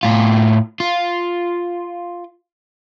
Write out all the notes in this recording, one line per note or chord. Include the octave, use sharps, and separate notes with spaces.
A2 F4
F4